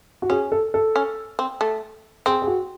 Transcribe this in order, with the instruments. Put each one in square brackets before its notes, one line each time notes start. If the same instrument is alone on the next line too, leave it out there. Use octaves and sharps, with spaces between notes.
[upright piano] F#4
[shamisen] C#4 [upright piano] G#4
[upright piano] A4
A4
[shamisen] C#4
C4
A3
[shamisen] C4 [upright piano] G#4
[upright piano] G#4
F#4